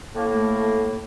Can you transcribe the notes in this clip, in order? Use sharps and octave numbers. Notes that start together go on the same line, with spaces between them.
A2 A#3
A3